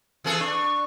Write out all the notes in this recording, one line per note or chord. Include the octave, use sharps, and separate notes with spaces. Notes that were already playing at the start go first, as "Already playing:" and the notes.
E3 G#4 A4
D4 C#6